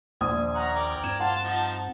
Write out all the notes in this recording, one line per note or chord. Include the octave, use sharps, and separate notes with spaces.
A#1 D#2 C5 D#6 G#6
C#4 F#5 A#5
A#4 D5 G5
G2 C4 G#6 E7
F4 F#5 A5 C6
F3 D#4